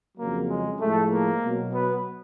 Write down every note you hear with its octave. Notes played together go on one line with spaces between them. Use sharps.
F2 C#3 F#3 A#3
G#3
A2 F3 G#3 A3
A#3
B2 F#3
B3